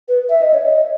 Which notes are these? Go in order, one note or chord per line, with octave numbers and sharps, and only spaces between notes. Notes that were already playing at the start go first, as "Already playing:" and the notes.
B4
E5
D#5
C#5
D#5